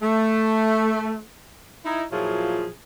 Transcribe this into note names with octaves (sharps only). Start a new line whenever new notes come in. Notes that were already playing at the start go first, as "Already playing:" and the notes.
A3
D#4 E4
A#2 F3 F#3 E4 F4 G#4